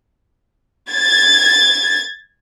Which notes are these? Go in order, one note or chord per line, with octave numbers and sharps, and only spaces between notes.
G#6 A6